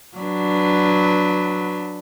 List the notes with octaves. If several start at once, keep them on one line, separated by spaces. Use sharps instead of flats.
F#3 D4 B4